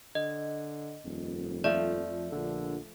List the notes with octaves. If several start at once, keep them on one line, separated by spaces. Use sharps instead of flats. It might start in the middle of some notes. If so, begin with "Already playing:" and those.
D3 D#5
D#1 F2
F3 A3 D5
A#1 D3